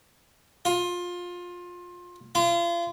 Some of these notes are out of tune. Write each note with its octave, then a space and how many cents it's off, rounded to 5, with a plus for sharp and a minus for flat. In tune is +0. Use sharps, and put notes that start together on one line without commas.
F4 +20
F4 -35